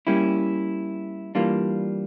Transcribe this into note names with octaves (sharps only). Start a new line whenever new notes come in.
G3 A#3 C#4 E4
E3 G3 A#3 D4 F4